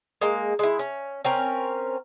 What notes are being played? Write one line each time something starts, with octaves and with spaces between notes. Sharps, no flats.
G#3 A#3
G#3 E4
C#4
C4 C#4 A#4